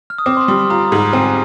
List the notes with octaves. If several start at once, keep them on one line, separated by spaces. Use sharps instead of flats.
F6
D#6
C4 D6
C6
G3 C6
C6
F4 A#5
G#2
C4 G#5